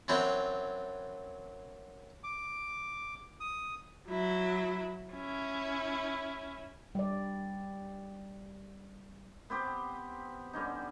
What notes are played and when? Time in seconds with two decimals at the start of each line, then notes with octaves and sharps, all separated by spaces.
0.08 F#2 E3 F#3 C4 D4
2.24 D6
3.40 D#6
4.08 F#3 E4
5.13 C#4 E4
6.95 G3 D5
9.50 B3 C4 G4 C5
10.53 D3 G3 C#4 D#4